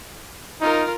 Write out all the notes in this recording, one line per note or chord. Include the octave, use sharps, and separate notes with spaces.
D#4 F4 A#4